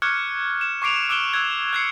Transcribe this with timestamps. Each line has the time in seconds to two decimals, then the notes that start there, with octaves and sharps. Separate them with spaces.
0.02 C#6 D6 F6 F#6 G#6 C#7
0.61 E7
0.82 C#6 D6 C7 D7 F7
1.09 D6 E6 F#6 D7 E7 G7
1.34 E6 F#6 G#6
1.73 F#6 G#6 C7 C#7